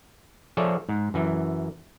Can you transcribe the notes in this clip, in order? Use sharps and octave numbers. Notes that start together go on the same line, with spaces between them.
F3 G#4 A4 C#5 D5 E5
G#2
F#2 E3